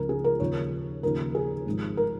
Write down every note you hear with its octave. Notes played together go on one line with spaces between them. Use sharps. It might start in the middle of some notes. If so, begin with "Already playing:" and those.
Already playing: C#2 C#3 F3 A#4
G#4
A#4
D#2 C#3 F3 C#5
D#2 C#3 F3 A#4
G#4
G#1 G#2 F3
A#4